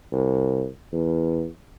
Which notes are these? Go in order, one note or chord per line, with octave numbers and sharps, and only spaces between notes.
C2
E2